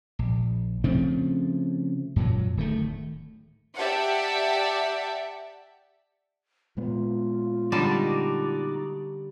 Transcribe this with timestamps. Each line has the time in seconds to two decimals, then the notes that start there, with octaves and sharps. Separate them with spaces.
0.19 A#1
0.84 C#3 F3 A3 C4
2.16 F#2 A#2 F#3
2.57 D1 D#3 A3
3.77 G4 D5 E5 F#5 A5
6.77 A#2 G#3 B3 F4
7.72 D3 G3 D#4 F#4 D5 A5